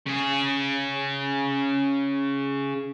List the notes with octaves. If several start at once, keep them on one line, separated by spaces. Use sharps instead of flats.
C#3 G#4